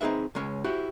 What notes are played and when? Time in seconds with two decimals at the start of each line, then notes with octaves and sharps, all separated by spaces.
0.01 C4 D#4 G#4 B4 E5
0.35 C#2 G#3 C#4 C#5
0.64 E4 F#4 G4 C5